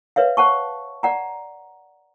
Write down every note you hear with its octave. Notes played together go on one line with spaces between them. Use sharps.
B4 C#5 E5 F5
C5 F#5 A5 C#6
D5 F#5 A#5